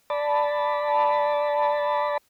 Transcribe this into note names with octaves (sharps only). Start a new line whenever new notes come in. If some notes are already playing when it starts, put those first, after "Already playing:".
D5 A5 B5